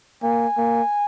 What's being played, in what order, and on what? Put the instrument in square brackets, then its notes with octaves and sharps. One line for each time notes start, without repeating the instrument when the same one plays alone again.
[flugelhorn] A#3 [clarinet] G#5
[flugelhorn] A#3